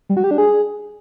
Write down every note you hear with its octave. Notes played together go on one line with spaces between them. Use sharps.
G3
F#4
G4
D4
G#4